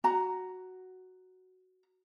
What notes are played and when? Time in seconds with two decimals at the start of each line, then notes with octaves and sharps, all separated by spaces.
0.04 F#4 A#5